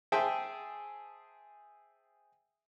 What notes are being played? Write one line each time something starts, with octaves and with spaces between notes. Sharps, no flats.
G#4 C5 E5 G5 A5